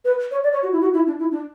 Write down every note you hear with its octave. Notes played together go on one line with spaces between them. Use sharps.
B4
C#5
D5
C#5
F#4
E4
F#4
E4
D4
E4
D4